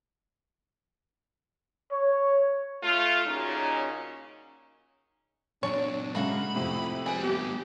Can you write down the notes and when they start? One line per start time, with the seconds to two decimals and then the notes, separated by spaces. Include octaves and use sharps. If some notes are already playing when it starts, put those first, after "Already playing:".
1.91 C#5
2.83 A3 F4
3.26 A#2 C#3 F#3 C#4 D#4
5.63 A#2 F#3 D4 C#5 A5
6.15 G#2 C#3 A3 A#3 F#4 B5
6.55 F2 A2 C3 E4
7.06 G4 G#4 B4 B5
7.23 G3 B3 G4